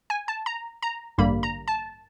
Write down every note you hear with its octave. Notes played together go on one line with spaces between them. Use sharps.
G#5
A5
A#5
A#5
A1 G2 D3 G3 A#3 B5
A#5
A5